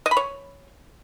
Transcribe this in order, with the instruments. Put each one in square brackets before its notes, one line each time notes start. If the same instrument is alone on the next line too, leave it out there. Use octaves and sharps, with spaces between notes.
[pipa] D#5
B5
C#5